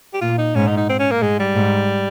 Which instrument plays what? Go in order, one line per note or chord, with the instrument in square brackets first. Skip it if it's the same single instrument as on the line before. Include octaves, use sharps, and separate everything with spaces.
[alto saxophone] G4
[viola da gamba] A#2 [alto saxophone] F4
[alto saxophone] D#4
[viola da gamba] G#2 [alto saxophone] C#4
[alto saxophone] D#4
D#4
C4
C#4
A#3
[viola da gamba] G#2 [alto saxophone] G#3
[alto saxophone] G3
[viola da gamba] G#2